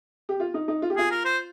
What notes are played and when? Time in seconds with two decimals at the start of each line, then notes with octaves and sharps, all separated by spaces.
0.29 G4
0.40 F4
0.54 D#4
0.68 D#4
0.82 F4
0.90 G4
0.97 F4 G#4
1.11 A#4
1.25 C5